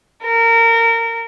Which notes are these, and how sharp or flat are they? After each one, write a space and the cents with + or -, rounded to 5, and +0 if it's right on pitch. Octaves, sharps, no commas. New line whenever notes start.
A#4 -25